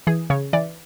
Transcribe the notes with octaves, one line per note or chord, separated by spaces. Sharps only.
E3 G#4
C#3 C#5
E3 D5